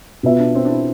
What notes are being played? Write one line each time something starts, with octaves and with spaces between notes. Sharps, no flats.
B2 B3 F4 B4 E5
D4
C4
D4
E4